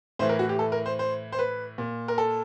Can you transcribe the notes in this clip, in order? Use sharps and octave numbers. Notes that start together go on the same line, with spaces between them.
A2 E3 C5
A#4
F#4
G4
A4
A#4
C5
C5
C5
B4
A#2
A#4
A4